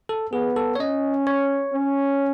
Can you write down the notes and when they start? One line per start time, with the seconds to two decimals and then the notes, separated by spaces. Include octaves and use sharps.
0.09 A4
0.32 B3 G#4
0.56 A4
0.75 C#5
0.79 C#4 D#5
1.27 C#5
1.73 C#4